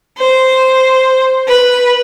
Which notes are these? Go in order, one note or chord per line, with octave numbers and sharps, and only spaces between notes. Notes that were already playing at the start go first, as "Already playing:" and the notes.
C5
B4